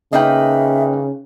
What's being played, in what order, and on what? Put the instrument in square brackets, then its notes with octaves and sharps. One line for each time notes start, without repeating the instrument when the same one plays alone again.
[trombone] C#3 [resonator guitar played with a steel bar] A#3 D#4 B4 [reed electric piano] D#5 G5 [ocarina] E5